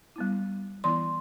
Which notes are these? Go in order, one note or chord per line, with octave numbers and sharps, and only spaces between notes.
G3 B3 E4
E3 B3 E4 C6